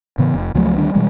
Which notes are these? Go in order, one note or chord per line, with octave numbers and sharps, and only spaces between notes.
A2 C#3 E3 B3
F1
C#2 F3 F#3 A3
D2 D#3 G3 D4
B2 E3 G3 G#3